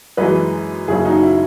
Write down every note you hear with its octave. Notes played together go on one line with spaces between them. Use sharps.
F#2 E3 G#3 B4 D#5
F#1 F#2 C#3 E4 G#4
D#4 F#4
E4